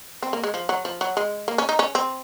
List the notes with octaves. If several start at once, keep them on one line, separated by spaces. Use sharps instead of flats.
C4
A#3
G#3
F3
F#3
F3
F#3
G#3
A#3
C#4
D#4
C#4
C4